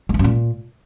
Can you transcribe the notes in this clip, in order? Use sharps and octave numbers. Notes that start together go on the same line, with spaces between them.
G#3
A#3
F#2
A#2